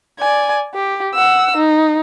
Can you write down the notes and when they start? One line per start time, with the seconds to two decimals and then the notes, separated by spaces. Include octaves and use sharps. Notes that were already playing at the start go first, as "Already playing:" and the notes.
0.20 D5 G#5
0.75 G4
1.14 F#5 E6
1.57 D#4